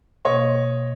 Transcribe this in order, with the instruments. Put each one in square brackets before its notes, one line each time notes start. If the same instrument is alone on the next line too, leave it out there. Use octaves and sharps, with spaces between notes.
[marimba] B2 A#3 [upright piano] C#5 D#5 C#6